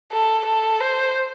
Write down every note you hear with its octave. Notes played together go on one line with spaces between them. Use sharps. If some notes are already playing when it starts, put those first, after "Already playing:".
A4
A4
C5